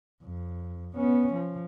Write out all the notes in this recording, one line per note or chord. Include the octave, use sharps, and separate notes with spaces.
F2
B3 C#4
F3